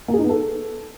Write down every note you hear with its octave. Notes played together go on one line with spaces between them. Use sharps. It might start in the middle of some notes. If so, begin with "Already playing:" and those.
A#3
G#4
D#4
B3
A4